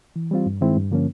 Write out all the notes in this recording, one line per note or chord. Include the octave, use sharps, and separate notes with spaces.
E3
G3 C4 F4
G2
D#3 G#3 C4 E4
G2
D3 F3 A#3 C#4